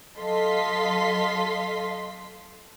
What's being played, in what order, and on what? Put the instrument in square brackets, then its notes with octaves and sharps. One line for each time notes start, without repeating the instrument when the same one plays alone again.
[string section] F#3 A4 D#5 F5 C6 B6